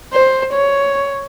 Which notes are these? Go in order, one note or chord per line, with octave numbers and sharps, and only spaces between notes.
C5
C#5